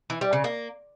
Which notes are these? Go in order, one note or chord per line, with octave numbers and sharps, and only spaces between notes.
E3
G3
C#3
A#3